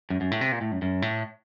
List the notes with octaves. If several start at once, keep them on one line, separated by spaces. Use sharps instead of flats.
F#2
F#2
A2
C3
A#2
A2
F#2
F#2
A2